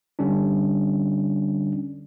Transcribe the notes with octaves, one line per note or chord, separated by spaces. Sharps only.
D3 G3 C#4 D4